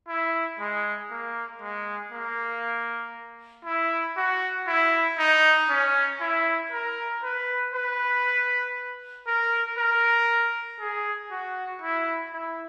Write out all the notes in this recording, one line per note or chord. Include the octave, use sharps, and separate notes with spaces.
E4
G#3
A#3
G#3
A#3
E4
F#4
E4
D#4
C#4
E4
A#4
B4
B4
A#4
A#4
G#4
F#4
E4
E4